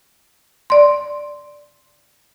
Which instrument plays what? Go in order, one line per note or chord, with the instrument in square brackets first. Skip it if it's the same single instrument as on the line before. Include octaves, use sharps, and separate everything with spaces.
[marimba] D5 C6